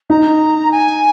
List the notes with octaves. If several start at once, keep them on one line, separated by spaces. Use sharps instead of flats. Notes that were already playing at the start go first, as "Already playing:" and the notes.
D#4 A#5
G#5